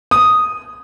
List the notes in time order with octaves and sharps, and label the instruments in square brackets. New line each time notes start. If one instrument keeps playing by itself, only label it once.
[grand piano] D#6